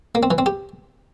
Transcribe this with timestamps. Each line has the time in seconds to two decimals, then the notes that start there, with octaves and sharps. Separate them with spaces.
0.15 A#3
0.23 C4
0.31 E3
0.38 C4
0.46 G4